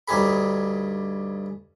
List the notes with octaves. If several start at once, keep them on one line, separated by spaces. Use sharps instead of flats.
D2 G2 D#4 G4 G#4 B5